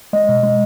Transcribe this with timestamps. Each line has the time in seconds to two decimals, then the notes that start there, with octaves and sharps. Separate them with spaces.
0.13 G#3 D#5
0.29 B2
0.43 G#3